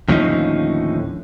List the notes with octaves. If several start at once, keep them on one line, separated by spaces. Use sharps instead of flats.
D#2 A2 D3 F3 C#4 D#4